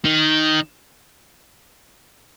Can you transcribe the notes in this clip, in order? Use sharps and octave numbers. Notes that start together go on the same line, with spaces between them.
D#3